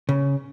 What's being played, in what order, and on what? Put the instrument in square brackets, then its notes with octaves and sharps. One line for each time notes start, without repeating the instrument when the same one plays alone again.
[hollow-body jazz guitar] C#3